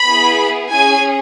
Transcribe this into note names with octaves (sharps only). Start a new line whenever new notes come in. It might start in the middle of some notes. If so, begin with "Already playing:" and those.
Already playing: B5
B3 E4 G#4
C#4 G#4 G#5